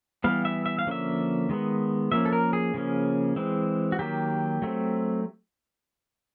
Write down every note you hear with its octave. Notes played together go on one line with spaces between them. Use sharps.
E3 G3 B3 F5
E5
E5
F5
D3 F3 A#3 C#4 E5
D#3 G#3 B3
F3 A#3 C#4 E5
A4
A#4
G#4
C#3 F3 A#3 C#4
E3 G#3 C4
F#4
D#3 F#3 A#3 G4
F#3 A3 C4